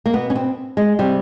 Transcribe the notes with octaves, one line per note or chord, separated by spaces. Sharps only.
A#3
B2 B3
C#4
C4
G#3
C3 G3